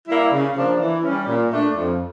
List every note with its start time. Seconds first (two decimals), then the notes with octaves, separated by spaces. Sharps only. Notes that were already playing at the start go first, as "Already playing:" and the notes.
0.08 G3 A#3 E4
0.33 C#3
0.56 F3 A#3 D4
0.80 E3
1.04 G3 C#4
1.27 A#2
1.51 A3 D4
1.75 F2